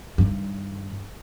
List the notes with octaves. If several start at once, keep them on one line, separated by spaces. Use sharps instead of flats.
G2 D#3